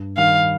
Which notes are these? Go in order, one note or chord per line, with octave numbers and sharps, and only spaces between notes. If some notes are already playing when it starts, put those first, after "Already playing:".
Already playing: G2
D#3 G3 F5